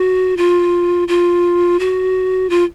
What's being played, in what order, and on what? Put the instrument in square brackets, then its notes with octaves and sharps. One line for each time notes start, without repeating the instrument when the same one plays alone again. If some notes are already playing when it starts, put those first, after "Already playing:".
Already playing: [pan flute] F#4
F4
F4
F#4
F4